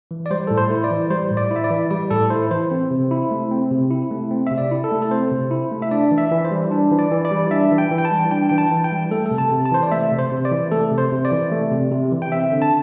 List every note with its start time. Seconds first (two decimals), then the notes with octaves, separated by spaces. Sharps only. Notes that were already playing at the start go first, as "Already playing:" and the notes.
0.11 E3
0.26 D5
0.31 G3 C5
0.47 A2 A4
0.57 C5
0.71 E4
0.84 D5
0.91 E3
1.10 G3 C5
1.31 A2
1.37 D5
1.51 E4 E5
1.64 D5
1.71 E3
1.91 G3 D5
2.11 A2 A4
2.30 E4 C5
2.51 E3 C5
2.71 C4
2.91 C3
3.11 E4
3.31 A3
3.51 C4
3.71 C3
3.91 E4
4.11 A3
4.31 C4
4.47 C3 E5
4.58 D5
4.71 E4
4.84 A4
4.91 A3
5.02 A4
5.11 C4 C5
5.31 C3
5.51 E4
5.72 A3
5.82 E5
5.91 D4 D5
6.11 E3
6.18 E5
6.31 E3
6.45 C5
6.51 G3
6.71 D4
6.91 E3
6.99 D5
7.11 E3
7.25 D5
7.31 G3
7.51 D4 E5
7.72 E3
7.78 G5
7.91 E3
7.98 G5
8.05 A5
8.11 G3
8.31 D4 G5
8.49 E3 G5
8.58 A5
8.71 E3
8.84 G5
8.92 G3
9.11 A3 A4
9.26 A4
9.31 C3
9.38 A5
9.52 C3
9.66 A5
9.71 E3 C5
9.83 D5
9.92 A3 E5
10.12 C3
10.19 C5
10.32 C3
10.45 D5
10.52 E3
10.71 A3 A4
10.92 C3
10.98 C5
11.12 C3
11.25 D5
11.31 E3
11.52 A3
11.71 C3
11.91 C3
12.12 E3
12.22 G5
12.32 C4 E5
12.52 D3
12.62 A5